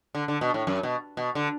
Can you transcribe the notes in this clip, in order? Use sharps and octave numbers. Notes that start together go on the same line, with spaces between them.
D3
D3
B2
A2
F#2
B2
B2
D3